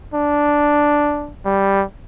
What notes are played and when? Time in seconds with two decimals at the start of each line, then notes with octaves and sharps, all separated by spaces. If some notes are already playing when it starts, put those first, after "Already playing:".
0.14 D4
1.45 G3